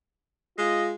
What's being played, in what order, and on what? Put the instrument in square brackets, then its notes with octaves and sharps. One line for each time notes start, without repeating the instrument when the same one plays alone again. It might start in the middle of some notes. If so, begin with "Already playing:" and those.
[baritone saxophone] G#3 [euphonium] F4 [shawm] D#5